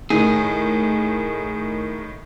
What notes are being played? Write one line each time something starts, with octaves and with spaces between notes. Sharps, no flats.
A2 D#3 G#4